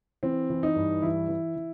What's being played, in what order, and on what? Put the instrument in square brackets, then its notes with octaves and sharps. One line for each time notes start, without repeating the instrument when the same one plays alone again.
[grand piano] E3 C4
E3
D#4
G2
E3 E4
E3
E3